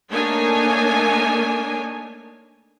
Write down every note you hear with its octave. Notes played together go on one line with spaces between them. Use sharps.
A3 A#3 D4 D#4 C#5 G#5